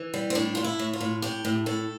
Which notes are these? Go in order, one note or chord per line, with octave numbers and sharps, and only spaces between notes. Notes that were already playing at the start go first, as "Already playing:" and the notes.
Already playing: E3
G3
C4
A2 D4
A2 F4
E4
A2
F4
A2
A2 G4
A2
A2 A4